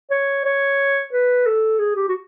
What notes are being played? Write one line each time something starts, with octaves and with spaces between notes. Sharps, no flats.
C#5
C#5
B4
A4
G#4
G4
F#4